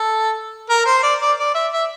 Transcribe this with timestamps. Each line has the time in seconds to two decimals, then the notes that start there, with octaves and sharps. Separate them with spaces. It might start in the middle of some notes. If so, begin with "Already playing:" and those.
Already playing: A4
0.70 A#4
0.86 C5
1.03 D5
1.21 D5
1.38 D5
1.55 E5
1.72 E5